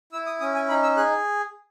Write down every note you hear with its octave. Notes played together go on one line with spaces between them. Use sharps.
E4 E6
D#6
C#4 D#6
G#5
D#4 B5
E6
G#4 F#6